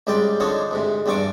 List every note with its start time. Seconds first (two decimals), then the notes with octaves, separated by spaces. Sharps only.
0.07 C#2 G#2 G3 C4 D5 G5
0.40 D3 F3 C4 D4 D#4 C#5
0.71 D2 G#2 C3
1.06 E2 G2 C4 D4 C#6 D6